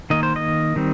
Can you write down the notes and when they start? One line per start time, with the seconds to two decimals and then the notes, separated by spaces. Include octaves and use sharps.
0.10 D#3 A#3 D#5
0.23 C5
0.36 D#5
0.76 D#3 G3 C4